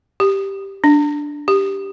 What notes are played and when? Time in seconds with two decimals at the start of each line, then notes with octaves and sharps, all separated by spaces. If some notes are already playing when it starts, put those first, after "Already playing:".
0.20 G4
0.84 D4
1.48 G4